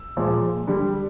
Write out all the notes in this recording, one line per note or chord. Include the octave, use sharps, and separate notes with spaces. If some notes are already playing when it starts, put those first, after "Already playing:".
Already playing: E6
A#2 F3 G#3
D3 G3